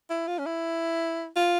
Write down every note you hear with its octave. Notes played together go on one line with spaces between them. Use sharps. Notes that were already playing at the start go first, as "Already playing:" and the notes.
E4
F4
C#4
E4
F4